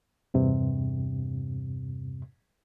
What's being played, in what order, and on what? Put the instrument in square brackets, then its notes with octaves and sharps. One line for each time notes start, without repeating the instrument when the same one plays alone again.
[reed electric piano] E2 G2 C3